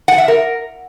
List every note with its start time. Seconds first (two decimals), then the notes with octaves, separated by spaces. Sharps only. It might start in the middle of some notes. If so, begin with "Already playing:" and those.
0.08 F#5
0.18 E5
0.28 A#4